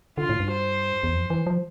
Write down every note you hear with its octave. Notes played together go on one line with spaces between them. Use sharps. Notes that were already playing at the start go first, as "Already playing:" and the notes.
D3 F4
A2
G2
C5
E2
F2
E3
F3